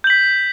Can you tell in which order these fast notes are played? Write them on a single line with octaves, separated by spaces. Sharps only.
G6 F#7 B6